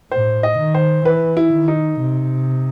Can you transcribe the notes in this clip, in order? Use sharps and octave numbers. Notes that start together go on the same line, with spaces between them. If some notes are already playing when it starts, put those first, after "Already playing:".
A2 C5
D#5
D#3
C5
E3 B4
E4
D#3
D#4
C3